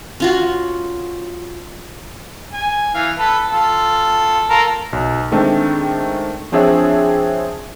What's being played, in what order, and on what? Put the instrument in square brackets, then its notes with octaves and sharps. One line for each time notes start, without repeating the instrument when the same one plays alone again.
[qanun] C#4 F4 F#4
[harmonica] G#5
E3 F5
A4 B4
F4 A4
F4 A4 A#4
[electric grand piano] B1
D#3 G#3 A3 C4 D4
F3 C4 D4 G#4 C#5 E5